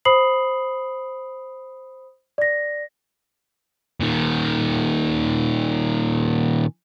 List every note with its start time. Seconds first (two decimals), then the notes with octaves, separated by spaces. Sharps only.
0.05 C5 B5 D#6 C7 F#7
2.38 D5 A#6
4.00 A#2 D#3